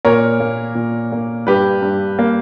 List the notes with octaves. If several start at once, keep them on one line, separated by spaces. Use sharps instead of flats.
A#2 A#4 C#5
A#3
A#2
A#3
G2 G4 B4
G2
A#3